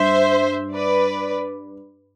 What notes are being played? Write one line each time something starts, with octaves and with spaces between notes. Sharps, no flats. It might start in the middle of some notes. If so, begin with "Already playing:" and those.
Already playing: G2 C5 E5
B4 D5